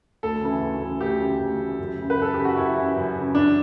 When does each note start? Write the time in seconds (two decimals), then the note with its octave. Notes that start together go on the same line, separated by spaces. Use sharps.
0.23 D2 A4
0.42 C#3 E3
0.61 D2
0.81 C#3 E3
1.01 D2 G4
1.20 C#3 E3
1.40 D2
1.59 C#3 E3
1.79 F#2
1.98 C#3 E3
2.10 B4
2.18 F#2 A4
2.34 C#3 E3 G4
2.45 F#4
2.57 F#2 E4
2.77 C#3 E3
2.96 F#2
3.16 C#3 E3
3.34 F#2 D4